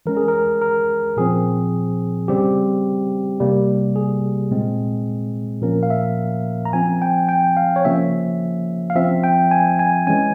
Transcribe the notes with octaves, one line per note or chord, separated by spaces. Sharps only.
E3 G#3 C#4 A#4
G#4
A#4
A#4
A#2 F3 C4 G#4
C#3 G3 C4 G4
C3 G3 A#3
G#4
A#2 G#3 C4
A#2 F3 A#3 C#4 A#4
F5
E5
A#5
F3 C4 G#5
G5
G5
F5
C#5
C#3 F3 A#3 C#4 E5
F5
F3 C4 E5
G5
G#5
G#5
E3 G#3 C#4 G#5